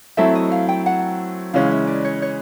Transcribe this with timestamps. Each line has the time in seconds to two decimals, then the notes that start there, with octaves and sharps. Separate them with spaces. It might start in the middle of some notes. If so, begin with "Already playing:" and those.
0.17 F#3 A3 C4 E4 A4 E5
0.35 D#5
0.52 F5
0.69 G5
0.86 F#5
1.53 C#3 E3 G#3 C#4 F5
1.71 E5
1.87 D5
2.05 C#5
2.22 C#5